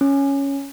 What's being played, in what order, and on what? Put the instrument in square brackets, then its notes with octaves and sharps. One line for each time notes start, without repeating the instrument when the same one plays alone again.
[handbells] C#4